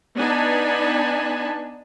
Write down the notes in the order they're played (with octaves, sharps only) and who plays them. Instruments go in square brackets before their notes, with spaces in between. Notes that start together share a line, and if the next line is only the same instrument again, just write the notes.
[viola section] B3 D4 D#4 G#5 A5 B5